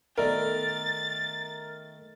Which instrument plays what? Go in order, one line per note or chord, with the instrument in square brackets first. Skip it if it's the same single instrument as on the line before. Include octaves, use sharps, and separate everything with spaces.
[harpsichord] D#3 A3 [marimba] B3 A4 D5 [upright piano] A#4 [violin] A6